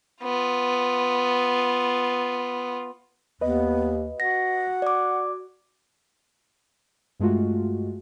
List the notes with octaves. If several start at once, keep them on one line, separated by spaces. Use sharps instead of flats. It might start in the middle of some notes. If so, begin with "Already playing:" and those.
B3 F4
D#2 B3 B4 D#5
F#4 F#5 A#6
D5 D6
G2 G#3 A3 F4 F#4